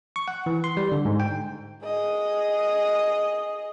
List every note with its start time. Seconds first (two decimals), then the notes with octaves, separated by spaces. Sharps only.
0.16 C#6
0.28 F#5
0.46 E3
0.64 C6
0.77 G3
0.92 D3
1.05 G#2
1.20 G5
1.85 G#4 D#5